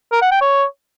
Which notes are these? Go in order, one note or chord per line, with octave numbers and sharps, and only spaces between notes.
A#4
F#5
G5
C#5